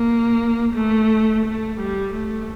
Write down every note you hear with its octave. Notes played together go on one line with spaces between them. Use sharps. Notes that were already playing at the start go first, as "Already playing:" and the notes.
Already playing: A#3
A3
A3
G3
A3